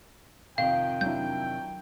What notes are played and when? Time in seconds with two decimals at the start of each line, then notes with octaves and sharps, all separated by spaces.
0.58 F2 C3 D#3 F5 G5
1.01 F#3 D4 E4 G6